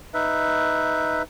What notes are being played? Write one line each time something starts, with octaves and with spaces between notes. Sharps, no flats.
D#4 B4 E5